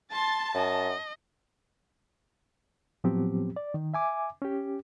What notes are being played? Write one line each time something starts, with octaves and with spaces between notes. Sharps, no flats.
A5 C6 A6
F#2 D#5
A2 F3 F#3 B3 C4 G4
D5
D#3
E5 G#5 D6
C#4 G4